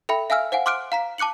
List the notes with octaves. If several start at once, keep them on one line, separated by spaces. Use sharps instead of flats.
A4 E5 G5 B5
E5 F5 G#5 E6 F6
C5 F5 F#5 G#5
C6 D6 F6 F#6 D7
F5 A#5 B6
A5 D6 F#6 C#7 F#7